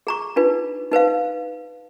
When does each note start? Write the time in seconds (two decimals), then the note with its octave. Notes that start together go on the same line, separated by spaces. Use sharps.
0.07 G#4 A#5 C#6
0.36 D4 D#4 F4 B4
0.92 D#4 B4 C5 F5